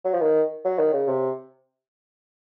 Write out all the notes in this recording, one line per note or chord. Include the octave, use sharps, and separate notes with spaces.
F#3
F3
D#3
F#3
D#3
C#3
C3